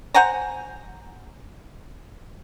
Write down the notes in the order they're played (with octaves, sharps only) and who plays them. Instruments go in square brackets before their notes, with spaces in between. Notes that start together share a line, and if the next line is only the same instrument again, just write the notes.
[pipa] C5 F#5 G#5 A#5